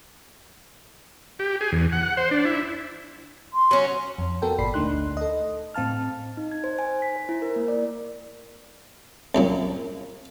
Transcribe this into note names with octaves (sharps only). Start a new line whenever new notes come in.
G4
G#4
E2
F#5
C5
D4
E4
C6
F#3 C#4
F2
B3 F#4 A4 A#4 G5
G1 A#2 D5 B5 C7
D2 A3 D4 D#4 C6 F#6
A4 D#5
A2 C4 F5 A5 F6
D#4
G#6
C5
G#5
B6
C5
E4
A#4
A#3
D5
C2 F#2 A#2